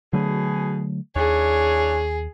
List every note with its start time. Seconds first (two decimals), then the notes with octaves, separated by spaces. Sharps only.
0.13 B2 D3 F#3 A3 G#4
1.16 D#2 D4 E4 G#4 C#5